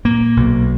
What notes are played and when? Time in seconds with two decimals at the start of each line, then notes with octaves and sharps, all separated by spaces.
0.05 A#2 A#3
0.37 B1